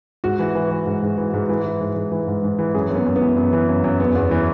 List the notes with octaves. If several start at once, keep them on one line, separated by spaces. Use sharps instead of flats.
G#2 F#4
E3
E3
E3
G#2
G#2
E3
G#2
E3
E3
G#2
G#2
E3
G#2
G#2
E3
F#2 G#4
F#2 B3
F#2
B3
E3
F#2
E3
F#2
F#2
E2 B3
E2
E3